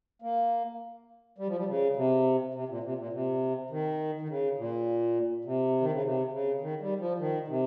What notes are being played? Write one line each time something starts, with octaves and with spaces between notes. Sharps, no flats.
A#3
G3
F3
G3
C#3
C3
C3
A#2
C3
A#2
C3
D#3
D#3
C#3
A#2
C3
D#3
C#3
C3
C#3
D#3
G3
F3
D#3
C3